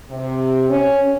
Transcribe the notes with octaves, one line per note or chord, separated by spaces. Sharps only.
C3
C#4